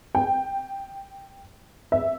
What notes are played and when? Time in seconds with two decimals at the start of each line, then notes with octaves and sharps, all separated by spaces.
0.15 G5
1.92 E5